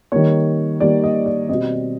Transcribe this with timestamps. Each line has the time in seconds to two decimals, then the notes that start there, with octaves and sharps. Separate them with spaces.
0.12 D#3 G3 A#3 C#5
0.80 D#3 G3 A#3 D5
1.04 D#5
1.26 D5
1.49 B2 G3 C4 D#5